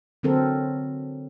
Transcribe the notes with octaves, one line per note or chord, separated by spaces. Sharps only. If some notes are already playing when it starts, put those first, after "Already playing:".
D3 F#3 C4 A4 A#4